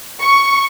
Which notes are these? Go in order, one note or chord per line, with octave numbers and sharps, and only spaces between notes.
C#6